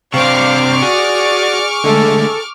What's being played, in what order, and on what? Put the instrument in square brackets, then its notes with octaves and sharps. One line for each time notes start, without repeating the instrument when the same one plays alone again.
[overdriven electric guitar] C3 D4 [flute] C5 [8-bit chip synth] F5 [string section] C#6 D6 F6
[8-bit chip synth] F#4 [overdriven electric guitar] G#4 [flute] D5
[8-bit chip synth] D3 G#3 A3 [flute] A4